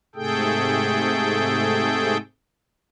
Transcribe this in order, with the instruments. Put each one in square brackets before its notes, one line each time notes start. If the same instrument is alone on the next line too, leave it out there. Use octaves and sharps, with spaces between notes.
[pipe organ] G#2 C3 A3 G#4 A4 G5